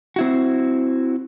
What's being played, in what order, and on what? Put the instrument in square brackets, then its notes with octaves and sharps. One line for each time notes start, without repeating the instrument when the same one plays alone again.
[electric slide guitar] C4 E4 F#4